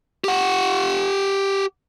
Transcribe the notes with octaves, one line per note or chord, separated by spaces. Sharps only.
G4 F#5